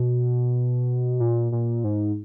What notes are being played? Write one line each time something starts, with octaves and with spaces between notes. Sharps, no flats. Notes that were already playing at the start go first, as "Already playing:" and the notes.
Already playing: B2
A#2
A#2
G#2